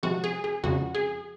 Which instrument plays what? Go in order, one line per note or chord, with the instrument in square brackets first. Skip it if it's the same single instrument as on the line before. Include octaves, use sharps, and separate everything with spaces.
[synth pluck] C3 F3 G#3 F#4
G#4
G#4
F2 C#3 G#3 F#4
G#4